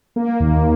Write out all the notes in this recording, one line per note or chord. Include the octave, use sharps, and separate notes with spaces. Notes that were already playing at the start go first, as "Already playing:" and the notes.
A#3
D#2